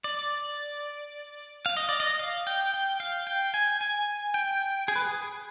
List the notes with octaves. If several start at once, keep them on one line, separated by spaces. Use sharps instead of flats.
D5
F5
D#5
D5
D#5
F5
G5
G5
F5
G5
G#5
G#5
G5
G#4
B4
G#4